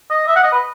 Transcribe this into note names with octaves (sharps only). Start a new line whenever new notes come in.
D#5
E5
F#5
D#5
B4